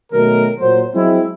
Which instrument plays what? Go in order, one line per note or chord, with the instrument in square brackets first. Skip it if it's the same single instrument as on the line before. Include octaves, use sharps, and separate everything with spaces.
[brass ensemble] B2 D#3 F#3 A3 A#4
A#2 F#3 A#3 C5
F#3 G#3 C4 E4